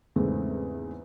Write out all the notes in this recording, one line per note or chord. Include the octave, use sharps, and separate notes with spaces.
E2 G#2 C#3 A3 C4